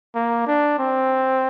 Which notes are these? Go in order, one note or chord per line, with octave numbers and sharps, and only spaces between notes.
A#3
D4
C4